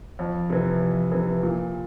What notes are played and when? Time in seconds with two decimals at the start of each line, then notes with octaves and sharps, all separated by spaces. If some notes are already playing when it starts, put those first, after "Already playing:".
0.19 F2
0.50 C3 E3
0.81 F2
1.12 C3 E3
1.43 A#2